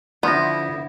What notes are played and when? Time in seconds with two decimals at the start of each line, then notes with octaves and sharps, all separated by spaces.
0.23 D3 F3 B3 E4 D5 G6 A#6